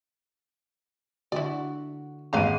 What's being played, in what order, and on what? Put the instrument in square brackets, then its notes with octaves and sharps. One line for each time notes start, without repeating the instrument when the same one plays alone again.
[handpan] D3 F#4 [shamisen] E4 D5
[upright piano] G#1 G#3 D#7 [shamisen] B4 F5 A#5